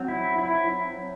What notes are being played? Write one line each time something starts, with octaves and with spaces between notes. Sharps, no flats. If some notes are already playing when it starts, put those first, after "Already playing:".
Already playing: F#3 C4
E4
E4